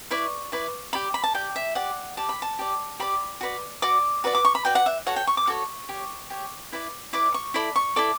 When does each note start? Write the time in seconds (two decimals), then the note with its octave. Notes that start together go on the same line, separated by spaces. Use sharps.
0.11 E4 B4 D5 C#6
0.52 E4 B4 D5
0.93 G4 D5 B5
1.14 B5
1.24 A5
1.35 G4 D5 G5
1.56 E5
1.75 G4 D5 F#5
2.17 G4 D5 A5
2.29 B5
2.42 A5
2.59 G4 D5
3.00 G4 D5 B5
3.41 F#4 B4 D5
3.82 F#4 B4 D5 D6
4.24 F#4 B4 D5
4.35 D6
4.45 C#6
4.55 B5
4.65 F#4 B4 D5 G5
4.75 F#5
4.86 E5
5.06 F#4 A4 C#5 F#5
5.16 G5
5.27 C#6
5.37 D6
5.47 F#4 A4 C#5 C#6
5.89 G4 C#5
6.30 G4 C#5
6.72 E4 B4 D5
7.13 E4 B4 D5 D6
7.34 C#6
7.54 E4 A4 D5 B5
7.76 C#6
7.96 E4 A4 D5 D6